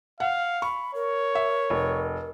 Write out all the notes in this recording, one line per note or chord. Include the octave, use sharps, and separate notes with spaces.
F5 F#5
B5 C#6
A#4 C#5
E5
F1